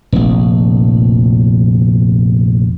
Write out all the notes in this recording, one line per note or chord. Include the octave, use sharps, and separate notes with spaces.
F1 A#1